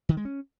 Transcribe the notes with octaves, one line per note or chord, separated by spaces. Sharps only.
D#3
G#3
C#4